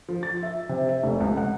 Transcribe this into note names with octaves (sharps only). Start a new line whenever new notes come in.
F3
A6
E5
C3
E5
F1
C#2
F#5